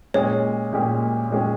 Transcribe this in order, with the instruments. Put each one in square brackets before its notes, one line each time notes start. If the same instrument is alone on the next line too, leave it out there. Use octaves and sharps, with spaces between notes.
[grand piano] A#2 G#3 C#4 G4 [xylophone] C#5
[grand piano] A#2 G#3 C#4 G4
A#2 G#3 C#4 G4